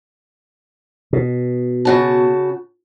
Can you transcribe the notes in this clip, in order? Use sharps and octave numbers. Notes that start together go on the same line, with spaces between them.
B2
C#3 F#4 A5